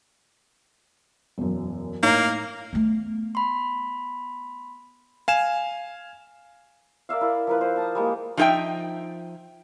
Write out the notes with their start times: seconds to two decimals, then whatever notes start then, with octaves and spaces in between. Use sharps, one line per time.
1.38 E1 F#2
2.03 A2 A#3 D#4 C#5
2.73 A3 B3
3.35 B5 C6
5.28 F5 G#5 E7
7.09 A#4 D5 E5 F5
7.21 E4 A#4 D5
7.47 F3 A#4 B4
7.61 C5
7.76 A5 D#6
7.95 G3 G#3 A#3
8.37 F3 D#4 G#4 E5 G5